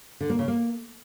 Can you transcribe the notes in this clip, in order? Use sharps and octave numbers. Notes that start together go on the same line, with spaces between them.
D3
A#3
C#3
A#3